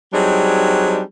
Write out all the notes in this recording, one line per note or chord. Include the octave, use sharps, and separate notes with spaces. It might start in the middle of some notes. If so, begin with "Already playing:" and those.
F#3 G3 C4 D4 D#4 G#4